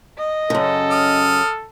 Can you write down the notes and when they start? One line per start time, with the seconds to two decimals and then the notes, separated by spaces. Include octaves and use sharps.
0.18 D#5
0.50 F#2 C#3 A4
0.90 D#6 F6